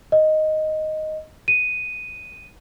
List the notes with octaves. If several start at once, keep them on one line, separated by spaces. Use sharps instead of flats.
D#5
D#7